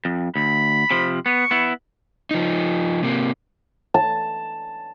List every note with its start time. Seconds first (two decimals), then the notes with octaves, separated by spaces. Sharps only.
0.05 F2
0.36 D2 B5
0.91 C3 F3
1.26 B3 C#6
1.51 B3 E4
2.31 F3 D#4
3.03 C3 A#3
3.94 A5